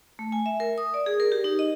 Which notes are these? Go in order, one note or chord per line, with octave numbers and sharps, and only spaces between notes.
A3
G#5
E5
A#4
D#6
D5
G#4
A#4
G4
D#4
D#5